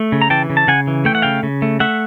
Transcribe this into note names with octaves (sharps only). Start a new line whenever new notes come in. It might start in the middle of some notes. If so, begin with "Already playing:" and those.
Already playing: A3
C#3
A#5
E3 G5 A5
C#3
A5
C#3 F#5 G#5
E3
A3 G5
F#5
C#3 F5 G5
C#3
A3
A3 E5 F#5